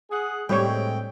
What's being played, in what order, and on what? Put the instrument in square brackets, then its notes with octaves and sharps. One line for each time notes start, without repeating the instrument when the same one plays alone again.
[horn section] G#4 F#5
[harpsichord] A2 [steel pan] G3 G4 C#5 [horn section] G#3 C4 G5